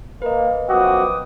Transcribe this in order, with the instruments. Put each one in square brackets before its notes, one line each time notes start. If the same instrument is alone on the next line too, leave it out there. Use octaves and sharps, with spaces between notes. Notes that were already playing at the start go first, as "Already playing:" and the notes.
[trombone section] A#3 [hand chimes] B4 D#5
[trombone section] F#2 F3 B3 [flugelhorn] F#4 [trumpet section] G5 D6 D#6